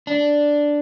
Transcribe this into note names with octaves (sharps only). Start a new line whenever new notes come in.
D4